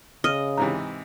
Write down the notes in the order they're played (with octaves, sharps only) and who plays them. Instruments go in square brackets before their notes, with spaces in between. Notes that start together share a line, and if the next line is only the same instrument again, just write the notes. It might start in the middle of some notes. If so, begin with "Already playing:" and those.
[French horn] C#3 [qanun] D#5 [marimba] F6
[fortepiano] G#2 C3 E3 [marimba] A#5